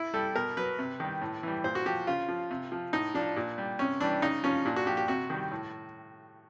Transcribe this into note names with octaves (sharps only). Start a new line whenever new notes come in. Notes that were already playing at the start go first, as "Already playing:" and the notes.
Already playing: E4
G3 A4
B2 A#4
F#3 B4
C3
D#3 G3
A2
E3 G3
A#2 C5
F#4
F3 G4
C#3 F4
F3
C3
F3
A2 D#4
F3 D4
A#2
G3
C3 C#4
E3 G3 D4
C#3 D#4
F3 C#4
A#2 D4
F#4
F3 G4
G4
C3 F#4
D#3 G3
A2